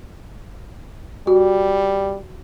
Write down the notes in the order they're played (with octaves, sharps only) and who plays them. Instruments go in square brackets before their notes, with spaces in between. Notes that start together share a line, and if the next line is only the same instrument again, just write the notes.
[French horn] G3 [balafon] F#4